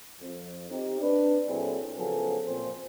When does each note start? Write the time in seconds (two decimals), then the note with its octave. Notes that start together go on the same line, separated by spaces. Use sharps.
0.20 F2
0.70 C4 D#4 G4
1.01 D4 B4
1.48 A#2 F#3 C4 E4 G#4 A4
1.97 C#3 F3 F#3 B3 G#4 A4
2.47 A#2 F3 C4 C5